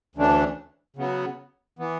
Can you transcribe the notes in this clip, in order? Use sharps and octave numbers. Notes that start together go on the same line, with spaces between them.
D2 C#3 E3 A3 D4
C#3 F#3 B3
E3 B3